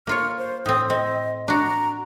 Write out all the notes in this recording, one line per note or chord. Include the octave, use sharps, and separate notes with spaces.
A#3 F4 C#5 F6
C5
A2 C4 D#6
C4 D#5
D4 F#4 A#5